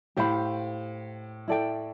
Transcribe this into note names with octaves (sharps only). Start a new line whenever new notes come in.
A2 G4 C5 F5 B5
E4 A4 D5 G5